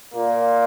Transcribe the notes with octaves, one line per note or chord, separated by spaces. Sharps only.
A#2 A#3